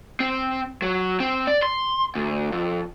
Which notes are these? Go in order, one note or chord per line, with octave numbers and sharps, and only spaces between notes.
C4
F#3
C4
D5
C6
D2
F2